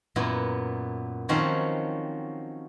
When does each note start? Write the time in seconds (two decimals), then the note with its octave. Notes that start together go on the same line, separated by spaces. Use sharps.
0.16 F#2 A#2 B3 E4
1.29 D#3 F3 F#3 C4 C#4